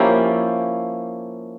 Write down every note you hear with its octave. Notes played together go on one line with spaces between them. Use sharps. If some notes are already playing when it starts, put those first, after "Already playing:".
Already playing: F3 A#3 C#4 E4 G4